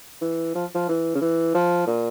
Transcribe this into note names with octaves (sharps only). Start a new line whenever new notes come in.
E3
F3
F3
E3
C#3
E3
F3
A#2